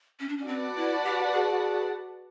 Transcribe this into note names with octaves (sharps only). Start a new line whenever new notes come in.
C#4
D4
C#4
C4 F#4 B4 D5 F#5 A5
E4
G4
G#4